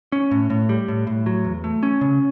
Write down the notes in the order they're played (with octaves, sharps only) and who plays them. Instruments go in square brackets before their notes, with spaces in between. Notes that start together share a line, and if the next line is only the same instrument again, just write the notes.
[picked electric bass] C#4
A2
A2
G3
A2
A2
F#3
E2
A3
C#4
C#3